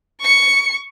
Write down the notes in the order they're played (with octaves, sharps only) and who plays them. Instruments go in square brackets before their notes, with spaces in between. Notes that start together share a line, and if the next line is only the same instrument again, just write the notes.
[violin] C#6 C#7